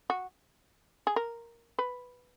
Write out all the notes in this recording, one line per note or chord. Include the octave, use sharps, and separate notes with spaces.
F#4
G#4
A#4
B4